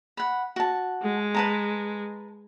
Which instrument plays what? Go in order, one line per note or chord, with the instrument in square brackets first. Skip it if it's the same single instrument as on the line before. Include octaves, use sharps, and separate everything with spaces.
[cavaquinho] F#5 B5
F#4 A5
[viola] G#3
[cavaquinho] B4 A5 A#5